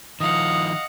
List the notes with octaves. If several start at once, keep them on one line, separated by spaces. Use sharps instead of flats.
D#3 F3 D#5 F5 F#5 D#6